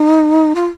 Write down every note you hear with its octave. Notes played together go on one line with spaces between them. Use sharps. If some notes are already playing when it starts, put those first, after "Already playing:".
Already playing: D#4
F4